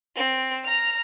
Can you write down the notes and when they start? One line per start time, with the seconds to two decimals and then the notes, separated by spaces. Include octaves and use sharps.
0.16 C4
0.64 A#5 F6